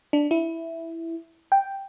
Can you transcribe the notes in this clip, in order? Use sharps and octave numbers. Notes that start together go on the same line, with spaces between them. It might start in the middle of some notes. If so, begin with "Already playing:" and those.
D4
E4
G5